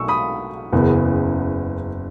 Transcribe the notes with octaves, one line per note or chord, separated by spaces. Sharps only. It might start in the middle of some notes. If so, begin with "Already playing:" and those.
Already playing: B1 B2 A3 C#6 E6
B5 D#6
F#1 E2 C#3 E3 B3